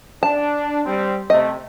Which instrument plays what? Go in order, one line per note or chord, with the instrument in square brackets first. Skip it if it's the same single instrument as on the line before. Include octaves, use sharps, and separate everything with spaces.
[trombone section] D4 [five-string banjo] A5
[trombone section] G3 C4
[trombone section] C3 A3 [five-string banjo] D#5